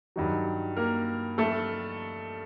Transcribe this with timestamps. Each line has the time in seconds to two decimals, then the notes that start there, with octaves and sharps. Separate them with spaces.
0.16 G2 D#3 F#3
0.77 A#3 A#4
1.38 A3 A4